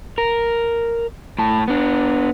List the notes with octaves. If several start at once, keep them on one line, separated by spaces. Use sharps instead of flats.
A#4
A2 A5
B3 D4